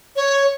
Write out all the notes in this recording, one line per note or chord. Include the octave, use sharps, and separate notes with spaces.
C#5